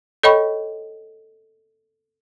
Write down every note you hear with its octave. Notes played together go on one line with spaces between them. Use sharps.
A4 C#5 D#5 G5 B5 C#6